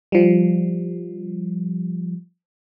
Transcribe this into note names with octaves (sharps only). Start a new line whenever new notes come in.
F3 G3